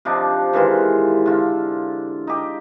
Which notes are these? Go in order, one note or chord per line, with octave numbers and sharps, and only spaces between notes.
C3 F3 D4 D#4
D#3 E3 G#3 F4
D3 F4
D#4 G4